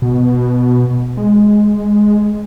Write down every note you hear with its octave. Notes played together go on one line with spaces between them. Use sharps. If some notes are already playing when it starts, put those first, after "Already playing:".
B2
G#3